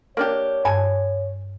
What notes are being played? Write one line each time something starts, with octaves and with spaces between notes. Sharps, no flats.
A#3 D4 G4 C#5
G2 G#5 A5